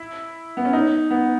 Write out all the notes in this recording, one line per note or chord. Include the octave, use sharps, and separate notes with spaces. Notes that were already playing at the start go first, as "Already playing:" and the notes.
Already playing: E4
B3
C#4
D#4
B3